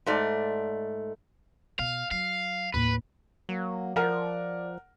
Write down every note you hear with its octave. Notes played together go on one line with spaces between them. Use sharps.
G#2 A3 D5
B2 F5
F#3 F5
D#2 A2 B4
F#3 A#3
F3 A#4 D5 F#5